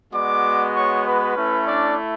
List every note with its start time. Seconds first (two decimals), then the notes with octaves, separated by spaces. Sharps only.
0.12 G#3 B3 F#4 D5 D6
0.75 C#5 C#6
1.05 B4 B5
1.36 A3 C#4 E4
1.67 D4 D5